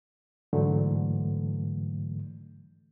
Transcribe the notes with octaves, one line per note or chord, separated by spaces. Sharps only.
G#2 D3 E3 F#3 A3